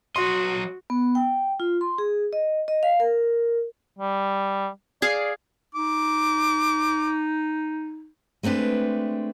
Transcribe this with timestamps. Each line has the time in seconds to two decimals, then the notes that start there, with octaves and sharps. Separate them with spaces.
0.16 F#3 F#4 D#5 C6
0.90 B3
1.15 G5
1.60 F4
1.81 C6
1.98 G#4
2.33 D#5
2.68 D#5
2.83 F5
3.00 A#4
3.98 G3
5.02 G#4 D5 F5
5.75 D#4 D6
8.43 G#3 A3 C4 D4 B4